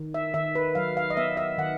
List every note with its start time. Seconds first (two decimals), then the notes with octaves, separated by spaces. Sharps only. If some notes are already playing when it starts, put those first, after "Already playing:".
Already playing: D#3
0.14 E5
0.34 D#3 E5
0.55 B4
0.75 F#3 F5
0.97 F5
1.10 D#5
1.17 B3 E5
1.37 E5
1.58 D#3 F#5